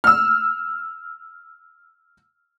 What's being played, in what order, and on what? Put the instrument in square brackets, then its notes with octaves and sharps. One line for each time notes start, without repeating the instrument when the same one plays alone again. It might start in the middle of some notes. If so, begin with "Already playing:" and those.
[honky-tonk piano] E6 F6